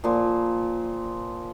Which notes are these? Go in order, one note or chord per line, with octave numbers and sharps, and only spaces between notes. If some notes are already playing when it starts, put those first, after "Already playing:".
A#2 F3